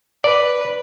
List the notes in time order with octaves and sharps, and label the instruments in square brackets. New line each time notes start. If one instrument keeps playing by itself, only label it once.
[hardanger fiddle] B4 [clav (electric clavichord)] D5